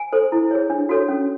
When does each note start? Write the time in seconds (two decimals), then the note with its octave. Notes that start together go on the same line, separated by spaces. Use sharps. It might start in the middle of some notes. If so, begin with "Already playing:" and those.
Already playing: G#5
0.13 A4 C5
0.32 E4
0.51 G#4 C#5
0.70 D4
0.89 F#4 A4 C#5
1.08 C#4